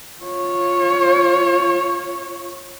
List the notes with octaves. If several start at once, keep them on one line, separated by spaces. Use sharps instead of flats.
F4 C#5